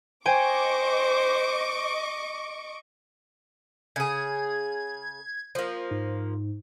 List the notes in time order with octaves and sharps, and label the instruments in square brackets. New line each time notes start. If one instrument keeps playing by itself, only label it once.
[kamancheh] C5 [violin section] D#5 C#6 D6 [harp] G5 G#5
[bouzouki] C#3 G#4 [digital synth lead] G#6
[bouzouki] F3 A#3
[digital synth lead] G#2